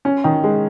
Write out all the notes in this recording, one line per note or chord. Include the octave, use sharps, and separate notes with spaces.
C#4
D#3
G#3